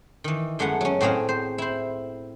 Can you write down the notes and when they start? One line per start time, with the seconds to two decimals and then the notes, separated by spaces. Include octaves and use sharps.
0.24 D#3 E3
0.59 F#2 G#3 A3 B3 F#5
0.81 F#3 C#4
1.01 A2 C4 F#4 G#4 D#5 F5
1.29 C5
1.58 E4 C5